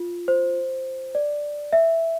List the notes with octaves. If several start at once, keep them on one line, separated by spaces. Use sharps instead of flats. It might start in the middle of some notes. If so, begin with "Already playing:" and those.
Already playing: F4
C5
D5
E5